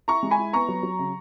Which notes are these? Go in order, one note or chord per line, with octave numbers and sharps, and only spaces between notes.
E4 A#5 C#6
G#3
G#5 B5
E4
B3 A#5 C#6
F#3
F#3
C#3